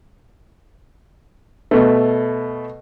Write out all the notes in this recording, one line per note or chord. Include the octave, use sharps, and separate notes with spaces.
B2 A3